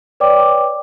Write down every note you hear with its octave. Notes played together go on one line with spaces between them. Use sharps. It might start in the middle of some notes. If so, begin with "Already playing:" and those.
B4 C#5 D5 G5 D6